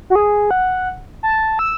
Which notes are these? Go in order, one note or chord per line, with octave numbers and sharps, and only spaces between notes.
F#4
G#4
F#5
A5
E6